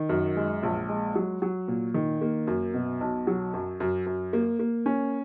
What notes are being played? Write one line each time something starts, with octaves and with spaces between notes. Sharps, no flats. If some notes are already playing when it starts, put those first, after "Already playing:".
Already playing: D#3
F#2
G#3
A#1
G#3
F#3
F#3
A#2
D#3
A#3
F#2
B2
B1
F#3
F#2
F#2
F#2
A#3
A#3
C#4